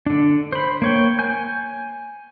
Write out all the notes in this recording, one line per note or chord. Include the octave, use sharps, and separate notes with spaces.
D3 D4
C5 B5
A#3 C#5 G5
G#5 G6